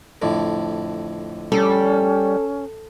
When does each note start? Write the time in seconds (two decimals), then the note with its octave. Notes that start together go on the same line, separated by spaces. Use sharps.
0.22 F2 A2 D3
1.52 G3 C#4 A4